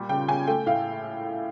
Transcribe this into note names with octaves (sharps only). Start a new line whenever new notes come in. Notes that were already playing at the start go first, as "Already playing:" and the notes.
Already playing: A#2 G3
C#3 G5
C#3 G#5
A3 G5
A2 F5